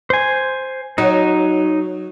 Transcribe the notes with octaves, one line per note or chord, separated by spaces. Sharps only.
C5 G#5
F#3 D#4